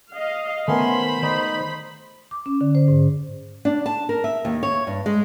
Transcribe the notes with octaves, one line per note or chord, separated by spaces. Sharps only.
D#5 F5
D#3 A3 B3 C#4 A#4 C5 B5 C6
D#3 D#4 D5
D6
C#4
D3
C5
G#2
D4
A5
A#4
E5
D#2
C#5
G2
G#3